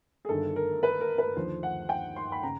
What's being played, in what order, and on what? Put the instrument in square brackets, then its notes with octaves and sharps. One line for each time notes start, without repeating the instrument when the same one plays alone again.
[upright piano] G#4
G1 G2 D#3 A4
A#4
B4
A#4
B4
D#2 D3 F3 C5
F#5
G5
C6
B5
C#3 A#5